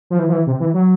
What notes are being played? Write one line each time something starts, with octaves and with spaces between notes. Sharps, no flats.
F3
E3
F3
E3
C3
E3
F#3